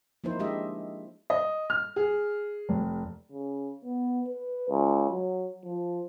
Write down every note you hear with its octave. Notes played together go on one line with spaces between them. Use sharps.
F3 A#3 D#4 E4 C5
G#3 D4 G4 D#5 E5
D#5
F6
G#4
F1
C#3
B3
B4
C#2
F#3
F3